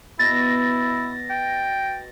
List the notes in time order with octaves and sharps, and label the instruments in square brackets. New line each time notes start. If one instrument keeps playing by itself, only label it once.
[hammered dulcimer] B2 [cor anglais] E4 [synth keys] A6 A#6
[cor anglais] G5